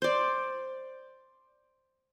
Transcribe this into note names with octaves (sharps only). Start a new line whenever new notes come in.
C5 D5